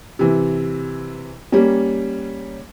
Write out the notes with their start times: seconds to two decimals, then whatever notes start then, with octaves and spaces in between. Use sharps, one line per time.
0.19 C3 E3
1.52 G3 A#3 C#4